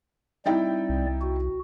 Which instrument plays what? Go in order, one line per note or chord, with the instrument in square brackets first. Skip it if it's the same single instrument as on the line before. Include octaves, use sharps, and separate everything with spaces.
[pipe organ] G3 C4 D5 [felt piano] D#4 E4 G5
[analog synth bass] C2
[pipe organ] F#4